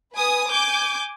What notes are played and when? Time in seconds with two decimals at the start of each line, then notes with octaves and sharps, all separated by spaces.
0.15 B4 G#5 D#6
0.49 G#5 D6 G6